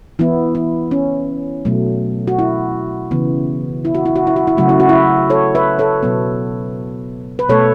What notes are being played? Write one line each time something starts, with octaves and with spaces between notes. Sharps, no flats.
E3 B3 E4
E4
C#4
B2 F#3 A3
F#4
E4
C#3 E3 B3
E4
F#4
E4
F#4
E4
F#4
E4
C#3 F#3 A3 F#4
E4
F#4
E4
A4 C#5
B4 E5
A4 C#5
B2 F#3 B3
B4
B2 A3 A4 C#5